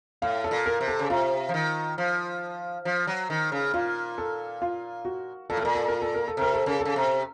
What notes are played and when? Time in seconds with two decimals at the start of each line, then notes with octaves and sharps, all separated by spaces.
0.22 A2 F5
0.44 A4
0.51 A#2
0.66 A#4
0.81 C3
0.88 A4
0.99 C#3
1.10 C3 F4
1.49 F3
1.54 D#3
1.98 F3
2.85 F3
3.07 F#3
3.30 D#3
3.52 C#3
3.74 A#2 F4
4.18 A4
4.62 F4
5.05 F#4
5.50 A#2 A4
5.57 A2
5.62 A#2 A#4
5.75 A4
5.88 A#4
6.02 A4
6.15 A#4
6.28 A4
6.37 C3 A#4
6.54 A4
6.66 C#3 A#4
6.80 A4
6.85 C#3
6.96 C3